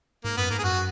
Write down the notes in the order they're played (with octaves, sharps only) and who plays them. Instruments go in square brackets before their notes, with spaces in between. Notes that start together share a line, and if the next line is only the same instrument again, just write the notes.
[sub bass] G#2 [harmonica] A#3
[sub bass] F#2 [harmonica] B3
[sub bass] G#2 [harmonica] A#3
[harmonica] G#4
[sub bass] F#2 [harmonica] F#4